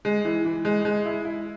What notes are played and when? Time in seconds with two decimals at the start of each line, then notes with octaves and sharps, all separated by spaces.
0.05 G#3
0.25 E3
0.45 E3
0.65 G#3
0.85 G#3
1.06 E4
1.25 E4